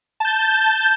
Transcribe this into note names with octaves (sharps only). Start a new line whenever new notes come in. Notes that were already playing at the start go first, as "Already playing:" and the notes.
A5 G6